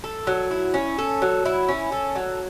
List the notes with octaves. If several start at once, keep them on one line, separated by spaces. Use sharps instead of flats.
A4
F#3
E4
C#4
A4
F#3
E4
C#4
A4
F#3